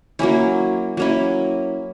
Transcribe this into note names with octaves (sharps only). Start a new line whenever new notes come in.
F#3 A#3 C#4 E4
F#3 A#3 C#4 E4